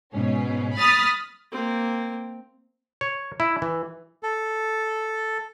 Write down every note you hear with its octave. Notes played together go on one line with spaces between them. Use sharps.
G#2 B2 C#4
B5 D#6 F6 A6 B6
A#3 C4
C#5
E4
E3
A4